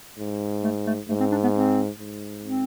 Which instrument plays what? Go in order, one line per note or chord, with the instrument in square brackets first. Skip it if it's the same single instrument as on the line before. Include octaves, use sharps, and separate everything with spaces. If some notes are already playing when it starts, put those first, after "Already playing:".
[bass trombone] G#2
[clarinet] A3
A3
[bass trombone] G#2 [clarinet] A3
[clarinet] C4
D4
B3
C4
[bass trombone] G#2
[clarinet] C4